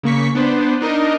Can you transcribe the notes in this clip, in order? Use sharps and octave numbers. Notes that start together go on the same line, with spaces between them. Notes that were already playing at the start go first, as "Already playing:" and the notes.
C#3 A#3 C#6 B6
B3 D4 B4 C5
D4 D#4 A#4 D#5